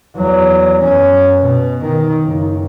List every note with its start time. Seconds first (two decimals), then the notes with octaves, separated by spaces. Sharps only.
0.16 E2 F#3
0.82 F#2 C#4
1.38 B2
1.83 D#3
2.23 F#1